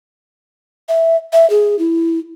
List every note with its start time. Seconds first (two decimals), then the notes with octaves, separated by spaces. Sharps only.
0.89 E5
1.33 E5
1.50 G#4
1.79 E4